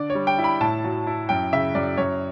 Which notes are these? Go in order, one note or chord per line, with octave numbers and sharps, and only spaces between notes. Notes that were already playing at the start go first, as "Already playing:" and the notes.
Already playing: D3 D5
C#5
G3
G5
E4
B5
A2 A5
F#3
E4
F#2 G5
C#3 E5
F#2 D5
F#2 C#5